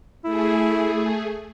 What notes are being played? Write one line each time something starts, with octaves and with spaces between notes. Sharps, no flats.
A3 E4 G#4